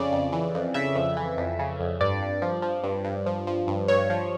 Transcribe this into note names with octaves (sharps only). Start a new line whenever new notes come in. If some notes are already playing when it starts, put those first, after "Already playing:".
Already playing: F2 C#3 D5
F2
E3
F2
C#3 E5
F2
E3
F2
C#3
F2
G2 D5
G2
F3
F3
G2
G2
F3
F3
G2
G2 C#5
F3